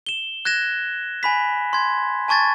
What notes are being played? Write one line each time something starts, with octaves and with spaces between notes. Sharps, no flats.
E7 G7
F#6 G#6 A#6 E7
G#5 B5 B6
C6 G#6
G#5 A5 C#6 G#6 A6